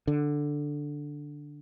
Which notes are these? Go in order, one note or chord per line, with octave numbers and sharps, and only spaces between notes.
D3